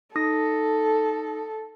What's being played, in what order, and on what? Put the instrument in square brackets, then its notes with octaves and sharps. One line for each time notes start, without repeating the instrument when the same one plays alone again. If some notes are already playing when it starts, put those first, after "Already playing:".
[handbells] D#4 D#6 A#6 [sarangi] A4